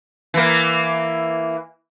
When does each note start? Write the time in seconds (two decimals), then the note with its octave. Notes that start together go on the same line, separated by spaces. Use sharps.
0.34 E3 A#3